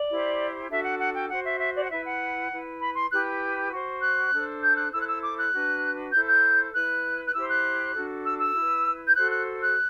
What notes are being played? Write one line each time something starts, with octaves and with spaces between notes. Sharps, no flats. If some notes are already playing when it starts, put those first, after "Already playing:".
Already playing: D5
E4 G4 C5
D4 F#4 A4 E5
F#5
F#5
G5
F#4 C5 F#5
E5
E5
D5
F#5
E4 B4 E5
F#5
E4 B4
B5
C6
E4 G4 B4 F#6
F#4 C5
F#6
D4 A4 C5
G6
F#6
E4 A4 C5 E6
F#6
E6
D6
F#6
D4 F#4 B4
E4 A4 C5 G6
G6
E4 B4 F#6
F#6
E4 G4 C5 E6
F#6
D4 F#4 A4
E6
E6
E4 B4
G6
F#4 A4 C5 F#6
F#6
F#6